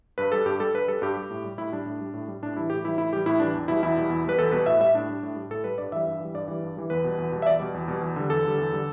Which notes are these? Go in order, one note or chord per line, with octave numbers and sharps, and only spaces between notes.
G2 B4
G3 A4
G2 G4
G3 A4
G2 B4
G3 A4
G2 G4
G3
A2
G3
A2 E4
G3 D4
A2
G3
A2
G3
A2 D4
E3 G3 E4
A2 G4
E3 G3 E4
A2 E4
E3 G3 G4
A2 E4
E3 G3 D4
E2
B2 G3 E4
E2 E4
B2 G3
E2
B2 G3 B4
E2 A4
B2 G3 B4
A2 E5
G3 E5
A2 D4
G3
A2
G3
A2 A4
G3 B4
G2 D5
E3 G3 E5
G2
E3 G3
G2 D5
E3 G3
G2
E3 G3
E2 B4
B2 G3
E2
B2 G3
E5
E2 D5
B2 G3
E2
B2 G3
E2
D3 G3
E2 A4
D3 G3
E2
D3 G3